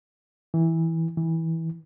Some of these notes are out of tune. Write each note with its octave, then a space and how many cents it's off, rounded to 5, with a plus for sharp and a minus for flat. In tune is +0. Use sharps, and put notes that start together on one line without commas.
E3 -15
E3 -20